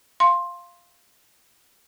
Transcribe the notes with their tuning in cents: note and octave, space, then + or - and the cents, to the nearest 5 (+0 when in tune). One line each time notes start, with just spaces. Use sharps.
F5 +0 C6 +10